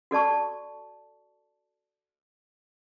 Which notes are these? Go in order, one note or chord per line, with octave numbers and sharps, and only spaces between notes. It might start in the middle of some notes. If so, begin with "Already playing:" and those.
F#4 A4 D5 A5 C#6